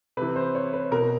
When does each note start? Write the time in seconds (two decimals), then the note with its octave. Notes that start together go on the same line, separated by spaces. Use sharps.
0.17 C3 E3 B4
0.36 C5
0.55 C#5
0.73 B4
0.91 B2 A#4